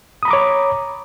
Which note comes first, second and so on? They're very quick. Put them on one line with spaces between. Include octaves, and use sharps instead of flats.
D#6 B5 A#5 D6 C#5